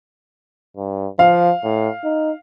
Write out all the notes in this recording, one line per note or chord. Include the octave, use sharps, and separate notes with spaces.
G2
F3 F5
A2
D#4